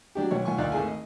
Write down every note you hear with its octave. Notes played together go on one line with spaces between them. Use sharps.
F#3 D4 G4
B1 C#5
B1 F4 G#5 C#6
D2 A#2 D#4 D5 F5 F#6
G#1 A3 G#4 G#5
D#5